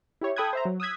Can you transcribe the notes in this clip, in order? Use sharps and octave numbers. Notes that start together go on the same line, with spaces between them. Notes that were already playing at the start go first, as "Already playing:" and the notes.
E4 G4 C#5
A4 G5 B5 D#6 F#6 G#6
C5 E5 A#5
F#3
D#6 E6 F#6 G#6 B6